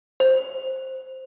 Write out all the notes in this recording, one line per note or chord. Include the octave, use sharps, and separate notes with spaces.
C5